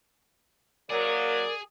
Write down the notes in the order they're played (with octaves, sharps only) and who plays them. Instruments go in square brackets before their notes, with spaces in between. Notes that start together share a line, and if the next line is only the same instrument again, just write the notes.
[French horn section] F#3 A#3 [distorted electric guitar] G#4 [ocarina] A#4 [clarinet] D5